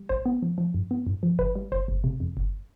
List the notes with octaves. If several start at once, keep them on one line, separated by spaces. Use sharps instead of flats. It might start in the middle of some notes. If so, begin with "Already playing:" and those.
Already playing: G3
A1 C5
B3
F3
F3
G2
B3
G2
F3
G1 B4
G3
G1 C5
G1
C3
F2
G1